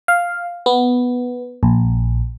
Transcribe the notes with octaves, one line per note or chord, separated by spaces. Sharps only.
F5
B3
A#1